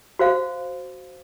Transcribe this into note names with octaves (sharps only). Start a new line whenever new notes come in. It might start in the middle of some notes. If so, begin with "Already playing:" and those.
F#4 C5 F5